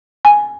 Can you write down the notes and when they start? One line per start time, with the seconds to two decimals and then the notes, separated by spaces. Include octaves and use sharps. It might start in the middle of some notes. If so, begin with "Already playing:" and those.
0.25 G#5